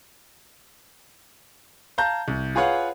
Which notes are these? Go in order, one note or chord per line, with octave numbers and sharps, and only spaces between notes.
F5 A5 A#5 G6
C2
F4 G#4 B4 C#5 F5 F#5